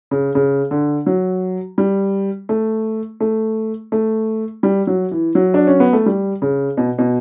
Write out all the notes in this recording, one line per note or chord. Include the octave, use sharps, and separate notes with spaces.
C#3
C#3
D3
F#3
G3
A3
A3
A3
G3
F#3
E3
F#3
D4
C#4
B3
A3
G3
C#3
B2
B2